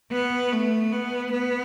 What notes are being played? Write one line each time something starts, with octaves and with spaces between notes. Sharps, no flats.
B3
A3
B3
B3